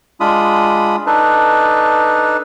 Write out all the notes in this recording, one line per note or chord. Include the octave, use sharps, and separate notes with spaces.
G#3 D4 F4 B5 D#6
D4 D#4 A4 B4